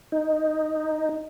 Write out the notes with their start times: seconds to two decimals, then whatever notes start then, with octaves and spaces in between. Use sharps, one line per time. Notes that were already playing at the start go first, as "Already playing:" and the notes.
0.12 D#4